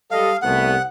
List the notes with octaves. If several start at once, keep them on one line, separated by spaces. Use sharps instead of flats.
G3 A4 D#5 F5
C2 A3 B3 F#5